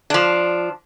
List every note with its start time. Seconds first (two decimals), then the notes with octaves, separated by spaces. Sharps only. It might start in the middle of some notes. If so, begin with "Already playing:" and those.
0.10 F3 D4